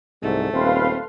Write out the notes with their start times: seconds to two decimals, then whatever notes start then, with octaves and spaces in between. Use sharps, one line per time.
0.23 C2 G#2 A3
0.53 D#1 C4 B4 F5 C6